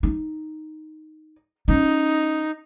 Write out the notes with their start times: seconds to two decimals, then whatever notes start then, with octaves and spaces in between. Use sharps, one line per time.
0.03 D#4
1.68 C#4 D#4